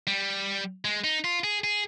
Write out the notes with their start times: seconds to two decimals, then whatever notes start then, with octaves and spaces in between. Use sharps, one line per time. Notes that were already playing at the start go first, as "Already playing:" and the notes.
0.07 G3
0.85 G#3
1.04 D#4
1.24 F4
1.44 G#4
1.64 G#4